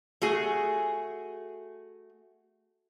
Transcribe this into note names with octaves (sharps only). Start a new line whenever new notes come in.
A3 F#4 G#4